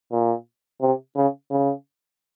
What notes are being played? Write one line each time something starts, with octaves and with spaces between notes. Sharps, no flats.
A#2
C3
C#3
C#3